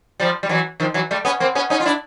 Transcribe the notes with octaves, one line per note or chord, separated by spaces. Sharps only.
F3 G3
G3
E3 F#3
D#3 F3
E3 F#3
G3 A3
B3 C#4
A#3 C4
B3 C#4
C#4 D#4
F4
D4 E4